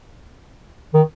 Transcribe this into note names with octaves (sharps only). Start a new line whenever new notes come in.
D#3